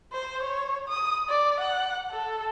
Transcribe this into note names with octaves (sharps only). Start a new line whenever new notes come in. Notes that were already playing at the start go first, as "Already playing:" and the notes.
C5
C#5
D#6
D5
F#5
A4